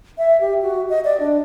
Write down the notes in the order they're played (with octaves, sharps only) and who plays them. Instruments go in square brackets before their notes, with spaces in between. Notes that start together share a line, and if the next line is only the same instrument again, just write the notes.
[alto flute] E5
G4
F#4
D#5
D5
D4